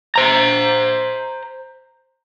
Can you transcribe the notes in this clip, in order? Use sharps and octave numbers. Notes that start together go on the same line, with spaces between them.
C5 A#5